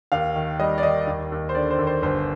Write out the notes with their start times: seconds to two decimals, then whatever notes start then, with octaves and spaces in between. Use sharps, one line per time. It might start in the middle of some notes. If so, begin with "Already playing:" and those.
0.12 D#2 F5
0.36 D#3
0.60 G3 D#5
0.78 D5
0.83 D#3 D#5
1.07 D#2
1.32 D#2
1.49 C5
1.55 D3 D5
1.70 C5
1.79 D#2
1.87 C5
2.02 G1 C5